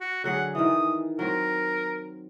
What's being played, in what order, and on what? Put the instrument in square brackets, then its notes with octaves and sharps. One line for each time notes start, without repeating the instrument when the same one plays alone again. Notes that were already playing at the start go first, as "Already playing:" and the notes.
[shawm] F#4
[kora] D3 F#3 G#4 [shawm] F#5
[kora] D#3 E3 [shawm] D#6
[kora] F#3 C4 [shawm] A#4